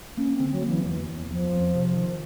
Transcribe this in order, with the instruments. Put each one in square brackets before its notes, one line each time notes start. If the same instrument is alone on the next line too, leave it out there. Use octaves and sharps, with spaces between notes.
[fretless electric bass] A#3 [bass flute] C#4
[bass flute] C4
[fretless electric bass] D3
[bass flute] F#3
[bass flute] E3 [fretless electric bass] A#3
[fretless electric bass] E2 [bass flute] E3
[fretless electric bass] E2
[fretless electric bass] E2 [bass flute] F3
[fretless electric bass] F2
C3
D#3